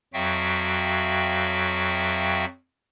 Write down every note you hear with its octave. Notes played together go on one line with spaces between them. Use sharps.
F2 F#3 F#4 E5 F5 G5